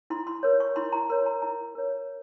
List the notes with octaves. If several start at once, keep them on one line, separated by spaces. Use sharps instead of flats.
E4 C6
C6
A#4 C#5
C#6
E4 C6
A#5
A#4 C#5 C6
A#5
E4 A#5
A#4 C#5